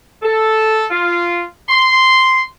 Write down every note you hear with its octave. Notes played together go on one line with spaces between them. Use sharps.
A4
F4
C6